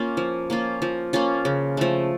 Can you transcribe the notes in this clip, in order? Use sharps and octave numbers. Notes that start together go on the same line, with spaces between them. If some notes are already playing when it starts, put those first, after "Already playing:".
Already playing: A#3 C#4 F4
F3
A#3 C#4 F4
F3
A#3 C#4 F4
C#3
F3 A3